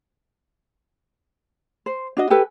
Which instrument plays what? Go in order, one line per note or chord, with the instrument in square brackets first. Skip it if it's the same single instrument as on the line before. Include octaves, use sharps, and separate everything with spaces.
[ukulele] C5
D4 F#4 D#5
G4 A4 B4 G#5